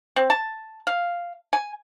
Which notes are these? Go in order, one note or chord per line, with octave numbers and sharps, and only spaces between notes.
C4
A5
F5
G#5